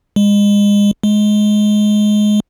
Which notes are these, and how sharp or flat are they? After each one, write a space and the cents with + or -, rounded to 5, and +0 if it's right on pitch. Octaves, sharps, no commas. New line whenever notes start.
G#3 -30
G#3 +15